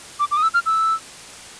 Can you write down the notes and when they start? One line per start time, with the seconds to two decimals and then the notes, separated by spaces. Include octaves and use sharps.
0.20 D6
0.31 D6
0.37 D#6
0.43 E6
0.54 F6
0.66 E6